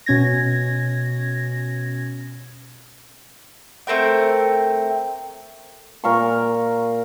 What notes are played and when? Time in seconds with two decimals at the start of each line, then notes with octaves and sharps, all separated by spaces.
0.06 B2 C#4 G#6 A#6
3.87 A3 C4 A#4 G5
6.04 A#2 A#4 F5 C#6